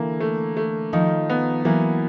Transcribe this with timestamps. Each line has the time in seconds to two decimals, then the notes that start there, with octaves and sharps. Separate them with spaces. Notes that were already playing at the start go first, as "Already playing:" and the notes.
Already playing: D3 E3 A#3
0.20 A3
0.57 A3
0.93 D#3 F3 D#4
1.30 B3
1.65 E3 F#3 A#3